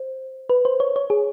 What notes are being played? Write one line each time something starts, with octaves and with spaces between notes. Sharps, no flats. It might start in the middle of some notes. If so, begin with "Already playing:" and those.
Already playing: C5
B4
C5
C#5
C#5
G#4